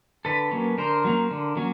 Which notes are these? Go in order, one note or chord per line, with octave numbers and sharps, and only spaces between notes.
D3 A4 B4
F#3 A#3 C#4
D3 A#4 C5
F#3 A#3 C#4
D3
F#3 A#3 C#4